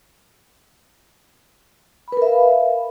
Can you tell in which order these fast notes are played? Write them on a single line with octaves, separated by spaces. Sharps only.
B5 B4 A#4 E5 F5